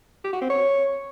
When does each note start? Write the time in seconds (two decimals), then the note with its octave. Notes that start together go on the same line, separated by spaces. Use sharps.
0.24 G4
0.33 F#4
0.41 C4
0.50 C#5